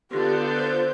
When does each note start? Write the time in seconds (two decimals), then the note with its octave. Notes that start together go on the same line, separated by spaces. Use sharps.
0.11 D3 B3 F4 G4 G6
0.58 C5